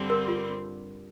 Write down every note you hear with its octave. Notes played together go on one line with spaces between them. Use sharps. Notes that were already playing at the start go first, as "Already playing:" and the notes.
Already playing: G2 D3 G3 C4
A#4
F4